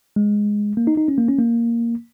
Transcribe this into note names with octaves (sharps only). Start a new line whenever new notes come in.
G#3
A#3
D#4
D#4
C#4
A#3
C#4
A#3